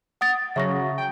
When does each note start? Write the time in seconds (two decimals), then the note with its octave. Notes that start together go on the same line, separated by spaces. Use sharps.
0.21 F#5 D#6 A6
0.56 C#3 F#3 E5 C#6 A#6
0.98 G5